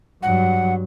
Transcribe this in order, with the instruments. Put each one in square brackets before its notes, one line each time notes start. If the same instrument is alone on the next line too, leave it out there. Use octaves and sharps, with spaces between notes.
[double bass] G2 F#3 [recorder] F#5